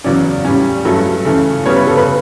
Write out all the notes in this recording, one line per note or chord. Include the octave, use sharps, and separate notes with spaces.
E2 C#3 F#3 C#4 D5
A2 G3 C#4
G2 F#3 A3 C#4 A4
C#3 E3 A3 C#4
C#3 G3 B3 C#5
B4
A4
B4